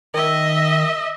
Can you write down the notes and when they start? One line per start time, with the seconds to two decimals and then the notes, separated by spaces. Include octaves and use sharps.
0.14 D#3 D#5 E5